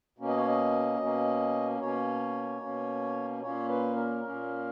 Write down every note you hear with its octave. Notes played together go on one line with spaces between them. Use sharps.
B2 A#3 C#4
D#5
C#5
D#5
B2 A#3 C#4
B2 A#3 C#4 C#5
B2 A#3 C#4
A#2 A#3 C#4 C#5
B4
A#4
A#2 A#3 C#4